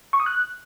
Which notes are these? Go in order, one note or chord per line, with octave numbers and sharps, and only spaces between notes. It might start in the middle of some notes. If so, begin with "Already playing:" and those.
C#6
D#6
F#6